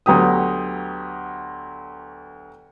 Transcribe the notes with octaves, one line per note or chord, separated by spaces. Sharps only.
D2 F#3 B3 G4 D#6